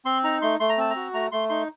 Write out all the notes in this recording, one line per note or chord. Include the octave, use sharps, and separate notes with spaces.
C4 C6
D#4 A#5
A3 C6
A3 C6
A#5
C4 A5
A#5
F#4
A3 A#5
A3 C6
D#4 C6